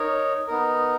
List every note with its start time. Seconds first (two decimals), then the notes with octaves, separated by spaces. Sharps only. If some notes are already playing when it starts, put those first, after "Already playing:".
Already playing: D#4 A#4 C#5
0.48 B3 D#4 A#4